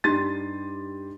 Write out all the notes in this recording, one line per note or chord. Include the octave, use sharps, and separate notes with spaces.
G2 D#4 G4 C6 A6 D#7